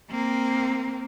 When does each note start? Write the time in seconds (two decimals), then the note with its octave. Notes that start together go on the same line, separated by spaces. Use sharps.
0.11 A#3 C4